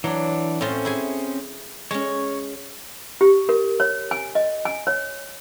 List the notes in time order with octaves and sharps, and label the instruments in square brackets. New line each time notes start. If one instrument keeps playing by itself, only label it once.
[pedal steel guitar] E3 D4 [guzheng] F#3
[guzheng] A2 F4 [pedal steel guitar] C4 C#4 C5
[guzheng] E4 G#4 G#5
[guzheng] G#3 C#4 [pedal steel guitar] C#5
[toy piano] G4
A#4
C#5
G#5
D#5
G#5
C#5